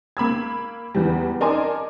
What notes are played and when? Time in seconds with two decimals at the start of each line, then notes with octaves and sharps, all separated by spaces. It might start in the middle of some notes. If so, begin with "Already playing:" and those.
0.17 A#3 B5 E6 G#6
0.95 E2 E3 G3
1.41 D#4 A#4 D5 G#5 A5 C6